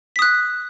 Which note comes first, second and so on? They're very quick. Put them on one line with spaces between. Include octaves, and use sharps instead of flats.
B6 D#6 F#6